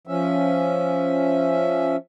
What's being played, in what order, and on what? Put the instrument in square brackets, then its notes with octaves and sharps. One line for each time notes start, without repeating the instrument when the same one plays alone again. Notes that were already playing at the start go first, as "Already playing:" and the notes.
[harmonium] F3 C#4 E5